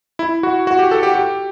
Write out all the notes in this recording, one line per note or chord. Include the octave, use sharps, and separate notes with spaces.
E4
F#4
F#4
G4
A4
G4
G4